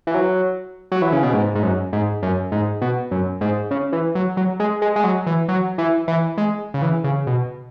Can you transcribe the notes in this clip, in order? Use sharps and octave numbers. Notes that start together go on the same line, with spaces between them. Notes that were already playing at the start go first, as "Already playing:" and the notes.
E3
F#3
F#3
E3
C#3
B2
G#2
G#2
F#2
G#2
F#2
G#2
B2
F#2
G#2
C#3
E3
F#3
F#3
G#3
G#3
G#3
F#3
E3
F#3
E3
E3
G#3
C#3
E3
C#3
B2